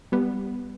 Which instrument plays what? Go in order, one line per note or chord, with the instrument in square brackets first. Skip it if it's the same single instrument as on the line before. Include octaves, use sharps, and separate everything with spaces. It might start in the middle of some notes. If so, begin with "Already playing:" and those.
[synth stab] G3 B3